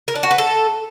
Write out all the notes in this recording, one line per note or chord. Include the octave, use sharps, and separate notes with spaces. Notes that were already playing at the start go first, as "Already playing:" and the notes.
A#4
D4
F#4
B4
A4